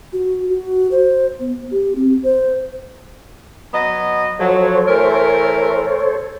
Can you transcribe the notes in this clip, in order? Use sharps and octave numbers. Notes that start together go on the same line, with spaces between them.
F#4
F#4
C5
B3
G4
C4
C5
F#3 B3 D#5
F3 F#3 A4 C5 C#5
E3 A3 A#4